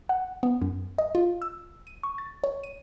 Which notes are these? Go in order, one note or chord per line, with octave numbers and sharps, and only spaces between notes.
F#5
B3
F#2
D#5
F4
E6
D#7
C#6
A6
C#5
D#7